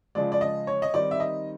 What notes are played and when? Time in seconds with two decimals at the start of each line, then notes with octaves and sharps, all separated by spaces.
0.15 C#3 F3 G#3 D5
0.32 D5
0.41 D#5
0.67 C#5
0.82 D#5
0.94 D#3 G3 C4 D#4 D5
1.11 E5
1.20 D#5